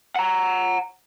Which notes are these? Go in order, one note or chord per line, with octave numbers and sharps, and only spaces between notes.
F#5 A#5